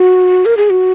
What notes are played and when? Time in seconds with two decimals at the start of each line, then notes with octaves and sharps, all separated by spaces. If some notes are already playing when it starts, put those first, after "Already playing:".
Already playing: F#4
0.45 A#4
0.57 G#4
0.70 F#4